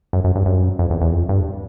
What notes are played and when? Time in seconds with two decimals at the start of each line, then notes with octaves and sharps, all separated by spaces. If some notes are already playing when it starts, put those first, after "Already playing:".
0.13 F#2
0.24 F#2
0.36 G2
0.46 F#2
0.79 F2
0.90 E2
1.02 E2
1.12 F2
1.29 G2